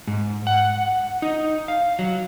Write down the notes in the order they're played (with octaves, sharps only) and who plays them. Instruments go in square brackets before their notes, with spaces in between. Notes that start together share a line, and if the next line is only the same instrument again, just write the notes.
[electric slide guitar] G#2
F#5
D#4
F5
F#3